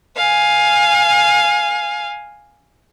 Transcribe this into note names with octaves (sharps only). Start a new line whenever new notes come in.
F5 G#5